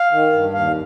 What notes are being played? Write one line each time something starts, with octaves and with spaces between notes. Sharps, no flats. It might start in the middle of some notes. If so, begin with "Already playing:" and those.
Already playing: F5
D#3
G2
D#2 F5